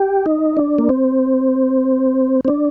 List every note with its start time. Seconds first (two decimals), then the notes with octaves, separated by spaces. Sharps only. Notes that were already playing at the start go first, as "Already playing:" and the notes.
Already playing: G4
0.26 D#4
0.57 D4
0.78 A#3
0.89 C4
2.45 C4
2.48 D4